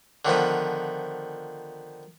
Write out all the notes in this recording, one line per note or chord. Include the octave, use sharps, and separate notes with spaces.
D3 D#3 F3 B3